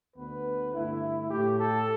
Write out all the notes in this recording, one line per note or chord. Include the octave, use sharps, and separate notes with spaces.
D2 D3 B3 B4
G2 D3 A3 E4
A2 A3 G4
A4